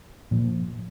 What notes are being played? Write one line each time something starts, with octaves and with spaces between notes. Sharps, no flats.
A#2 F3